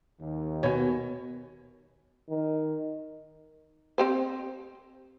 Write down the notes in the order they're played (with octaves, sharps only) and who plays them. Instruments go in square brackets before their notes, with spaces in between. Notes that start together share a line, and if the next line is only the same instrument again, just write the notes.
[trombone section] D#2 D#3
[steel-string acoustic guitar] B2 [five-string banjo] C#5 G#5
[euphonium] D#3
[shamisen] C4 G4 C5